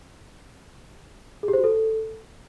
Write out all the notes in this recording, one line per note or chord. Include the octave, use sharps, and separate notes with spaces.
G#4
G4
C5
F#4
A4